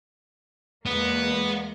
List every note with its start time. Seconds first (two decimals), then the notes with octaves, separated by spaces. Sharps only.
0.86 E2 G#3 A#3 B3